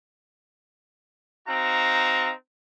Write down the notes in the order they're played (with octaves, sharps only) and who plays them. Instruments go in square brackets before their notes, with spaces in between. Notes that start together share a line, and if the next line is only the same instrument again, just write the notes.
[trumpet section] C4 D#4 F#4 F5 A#5